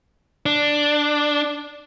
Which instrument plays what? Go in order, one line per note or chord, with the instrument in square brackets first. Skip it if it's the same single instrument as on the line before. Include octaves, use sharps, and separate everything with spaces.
[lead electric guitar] D4